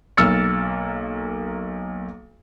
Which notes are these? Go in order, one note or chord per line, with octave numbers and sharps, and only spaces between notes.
B1 A#3 E6 F6 A6 C#7